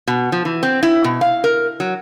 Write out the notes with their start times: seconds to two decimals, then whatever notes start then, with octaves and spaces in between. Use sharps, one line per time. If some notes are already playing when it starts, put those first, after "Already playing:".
0.08 B2
0.32 F3
0.45 E3
0.63 C4
0.83 E4
1.04 B2
1.21 F5
1.44 A#4
1.80 F#3